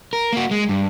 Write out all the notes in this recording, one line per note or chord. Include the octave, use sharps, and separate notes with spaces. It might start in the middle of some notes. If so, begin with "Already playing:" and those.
A#4
A#3 F#4
G#3
G2